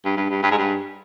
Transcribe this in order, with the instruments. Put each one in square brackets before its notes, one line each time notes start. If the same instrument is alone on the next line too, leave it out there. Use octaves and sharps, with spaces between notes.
[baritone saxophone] G2
G2
G2
G2
G#2
G2